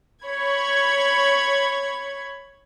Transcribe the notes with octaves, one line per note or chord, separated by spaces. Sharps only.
C#5 B5 G#6